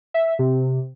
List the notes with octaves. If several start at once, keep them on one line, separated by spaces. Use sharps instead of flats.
E5
C3